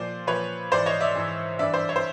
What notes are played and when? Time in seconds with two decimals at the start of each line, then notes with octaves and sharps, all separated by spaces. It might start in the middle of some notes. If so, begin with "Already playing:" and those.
Already playing: A#2 F3 C5 D5
0.27 A#2 F3 B4 C#5
0.71 G#2 E3 C5 D5
0.86 C#5 D#5
1.01 D5 E5
1.15 G#2 E3
1.59 G2 E3 D5 E5
1.74 C5 D5
1.89 C#5
1.96 C5